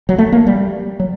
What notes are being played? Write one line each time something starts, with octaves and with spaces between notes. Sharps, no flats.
F#3
A3
A#3
G3
F#3